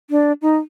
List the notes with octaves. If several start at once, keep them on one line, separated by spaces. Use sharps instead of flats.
D4
D#4